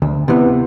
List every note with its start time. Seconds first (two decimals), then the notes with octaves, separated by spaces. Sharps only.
0.02 D2
0.28 C3 E3 B3